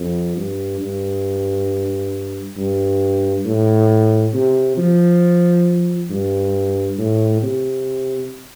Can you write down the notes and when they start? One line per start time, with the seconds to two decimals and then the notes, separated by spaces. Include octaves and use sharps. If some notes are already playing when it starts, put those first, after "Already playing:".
Already playing: F2
0.36 G2
0.81 G2
2.57 G2
3.45 A2
4.34 C3
4.77 F3
6.10 G2
6.98 A2
7.42 C3